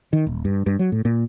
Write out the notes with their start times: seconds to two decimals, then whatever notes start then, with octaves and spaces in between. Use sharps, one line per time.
0.13 D#3
0.27 D#1
0.45 G2
0.66 G2
0.79 F#3
0.92 A2
1.05 A#2